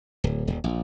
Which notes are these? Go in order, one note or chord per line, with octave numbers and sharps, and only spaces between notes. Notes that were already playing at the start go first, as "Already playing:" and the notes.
D1
D#1
A#1